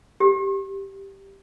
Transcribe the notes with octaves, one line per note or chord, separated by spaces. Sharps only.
G4